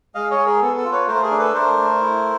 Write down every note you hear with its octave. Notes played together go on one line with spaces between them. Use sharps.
G#3 D#5 F5
C#5 D#5
G#3
G#4 A#4
B3 A4
A4
F4
B4 C#5
A3 A#4 C5
G#4 A#4
D4
A4 B4
A3 A#4 C5
A3
E4